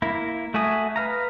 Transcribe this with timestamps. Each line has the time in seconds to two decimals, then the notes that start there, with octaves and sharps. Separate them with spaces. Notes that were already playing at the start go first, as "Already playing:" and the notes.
0.02 A#3 E4
0.54 A3 F#4 E5 G#5 D#6
0.96 B4 F5 A#5